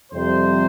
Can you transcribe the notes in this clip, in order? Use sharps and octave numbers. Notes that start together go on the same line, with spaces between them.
F2 C3 G3 C5